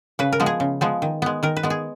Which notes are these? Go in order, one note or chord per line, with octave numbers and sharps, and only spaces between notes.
C#3 B4
A#4
F3 G#3 B3
G#4
C#3
F3 G#3 B3
D#3
G#3 B3
D#3 A#4
B4
G#3 B3
G#4